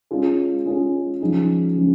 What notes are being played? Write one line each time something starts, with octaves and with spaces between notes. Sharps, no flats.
G#3 C#4 F4 G#4
G#3 C#4 F4 G#4
C#3 F3 G#3 D#4
C#3 F3 G#3